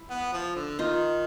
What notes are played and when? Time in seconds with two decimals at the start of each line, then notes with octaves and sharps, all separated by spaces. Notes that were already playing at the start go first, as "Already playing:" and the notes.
Already playing: E4
0.10 B3
0.33 F3
0.56 D3
0.79 D#3 D#4 F4